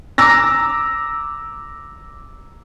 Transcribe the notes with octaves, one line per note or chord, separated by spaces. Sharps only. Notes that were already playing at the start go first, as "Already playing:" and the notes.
A#5 D6 E6 A#6